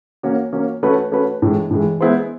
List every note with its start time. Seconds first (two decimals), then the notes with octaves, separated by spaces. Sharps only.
0.23 A#3 C#4 F#4
0.53 A#3 C#4 F#4
0.83 A3 C#4 F#4 B4
1.12 A3 C#4 F#4 B4
1.42 A2 E3 G#3
1.71 A2 E3 G#3
2.01 G#3 B3 E4 G#4 C5